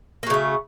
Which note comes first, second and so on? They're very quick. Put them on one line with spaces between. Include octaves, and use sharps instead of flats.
A#3 F#3 C#3 A3